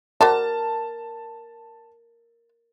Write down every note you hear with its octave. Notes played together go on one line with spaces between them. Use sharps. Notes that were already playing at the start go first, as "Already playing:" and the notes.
F#4 A#4 C5 D5 A5